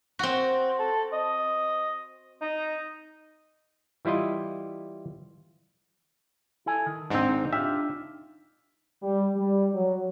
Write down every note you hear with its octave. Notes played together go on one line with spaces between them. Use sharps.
C4 F#4
A4
D#5
D#4
E3 G3 E4 F4 D#5
E4 A4 G#5
D#3
G#2 C4 D4 D#4
F4 G4 E5
G3
G3
F#3